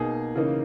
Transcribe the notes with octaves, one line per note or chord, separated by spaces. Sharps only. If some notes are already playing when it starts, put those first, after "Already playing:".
Already playing: B2 A#3 D#4 G#4
C#3 E3 A#3 D#4